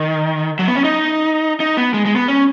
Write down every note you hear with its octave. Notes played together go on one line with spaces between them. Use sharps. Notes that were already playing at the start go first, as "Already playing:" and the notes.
Already playing: D#3
F#3
B3
C#4
D#4
D#4
B3
G#3
G#3
B3
C#4